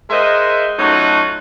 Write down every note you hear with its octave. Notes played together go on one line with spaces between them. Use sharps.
G#3 A#4 C5 D#5 E5 F#5
F#3 A3 C#4 D#4 F4 F#4